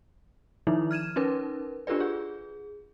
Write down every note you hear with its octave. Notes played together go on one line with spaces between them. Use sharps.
D#3 F3 D#4 E4
F6 G#6 D#7 E7
C#4 D#4 A#4 B4
D4 F4 G4 A4 B4 D5
G#4